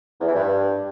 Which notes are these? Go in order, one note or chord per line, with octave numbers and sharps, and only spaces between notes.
E2
E3
G2